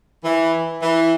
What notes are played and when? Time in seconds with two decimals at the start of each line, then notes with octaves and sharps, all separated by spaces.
0.24 E3
0.82 E3